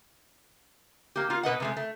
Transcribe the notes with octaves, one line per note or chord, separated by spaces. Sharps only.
A#3 G4
A#3 F4
B2 B4 D#5 F#5
C3 G#3 A3
A3